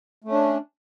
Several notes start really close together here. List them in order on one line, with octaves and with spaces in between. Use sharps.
A3 C#4 D4